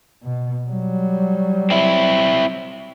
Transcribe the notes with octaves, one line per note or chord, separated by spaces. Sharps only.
B2
F#3 G3
C4 E4